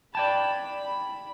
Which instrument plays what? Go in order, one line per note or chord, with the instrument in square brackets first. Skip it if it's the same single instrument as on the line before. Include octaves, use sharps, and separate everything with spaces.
[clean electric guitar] D5 G5 A5 [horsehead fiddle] B5